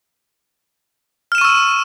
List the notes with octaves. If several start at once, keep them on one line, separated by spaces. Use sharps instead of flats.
C#6 E6 F6 D#7 E7